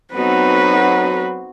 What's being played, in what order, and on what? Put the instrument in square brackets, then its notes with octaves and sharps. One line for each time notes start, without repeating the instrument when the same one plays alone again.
[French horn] F#3 [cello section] B3 D#4 A4 [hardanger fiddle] C4 F#4 [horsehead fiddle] B4